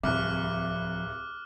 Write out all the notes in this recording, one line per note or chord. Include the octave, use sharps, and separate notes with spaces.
D1 C2 F3 D6 F6 F#6